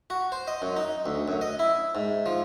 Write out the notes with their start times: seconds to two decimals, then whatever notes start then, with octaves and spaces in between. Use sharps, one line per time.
0.10 F#4
0.32 C5
0.48 D#5
0.62 F#2
0.76 D#4
1.06 D2
1.28 F#2
1.41 D#5
1.59 E4
1.95 G#2
2.26 F3